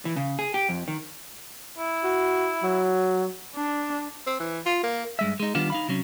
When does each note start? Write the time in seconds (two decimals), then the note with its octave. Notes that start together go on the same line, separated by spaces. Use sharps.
0.05 E3
0.16 C#3
0.39 G#4
0.54 G4
0.69 F2
0.88 D#3
1.78 E4
2.04 F#4
2.62 F#3
3.56 D4
4.27 C4
4.40 E3
4.66 F4
4.83 A#3
5.19 G2 G#3 E5
5.40 G#3 D#4
5.55 D#3 G3 B3 D4 F4
5.70 D#4 F5 B5
5.88 C3 F#3 C#4